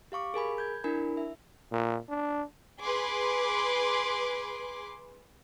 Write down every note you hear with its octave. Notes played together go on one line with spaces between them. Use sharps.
G4 F5 C#6 D6
G#4 A#4 G#5 B5
G6 G#6
D4 E4 A#4 G#5 B5
E5
A#2
D4
G#4 B4 C6 D6